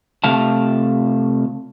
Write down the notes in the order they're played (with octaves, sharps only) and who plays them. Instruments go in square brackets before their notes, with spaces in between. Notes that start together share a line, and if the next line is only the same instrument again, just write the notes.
[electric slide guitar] C3 A3 F5 A5